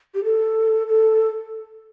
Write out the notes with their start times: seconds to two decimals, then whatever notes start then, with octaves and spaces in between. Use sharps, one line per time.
0.15 G4
0.24 A4
0.88 A4